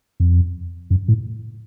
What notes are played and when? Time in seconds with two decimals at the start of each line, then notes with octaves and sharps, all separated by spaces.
0.20 F2
0.90 F#2
1.08 A2